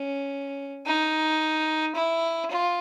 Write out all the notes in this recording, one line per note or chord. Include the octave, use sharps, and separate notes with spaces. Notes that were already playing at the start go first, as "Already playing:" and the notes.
Already playing: C#4
D#4
E4
F4